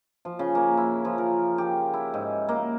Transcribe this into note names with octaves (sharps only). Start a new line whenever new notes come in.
F3
C#3
A#3
E4
F3
A#4
G4
E4
G#2
A#3